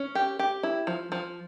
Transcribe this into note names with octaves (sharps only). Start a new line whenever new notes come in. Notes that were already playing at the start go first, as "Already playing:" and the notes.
Already playing: C#4
G4
G4
E4
F3
F3